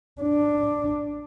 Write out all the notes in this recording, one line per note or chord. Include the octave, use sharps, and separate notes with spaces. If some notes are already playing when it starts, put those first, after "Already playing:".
D4